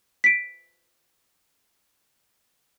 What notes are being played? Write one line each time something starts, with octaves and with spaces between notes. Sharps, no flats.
B6 D7